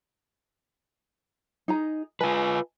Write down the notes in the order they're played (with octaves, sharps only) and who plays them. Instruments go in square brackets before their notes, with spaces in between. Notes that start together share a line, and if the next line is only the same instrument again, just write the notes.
[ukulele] D#4 G#4 A#5
[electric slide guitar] F4 B4 [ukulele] D#5 G#5 A5